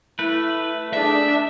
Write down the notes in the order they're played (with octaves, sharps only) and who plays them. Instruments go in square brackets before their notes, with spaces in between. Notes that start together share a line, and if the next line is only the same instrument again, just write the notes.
[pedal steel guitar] A3 B4 [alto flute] E4
[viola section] D4 [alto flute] G#4 [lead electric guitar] E5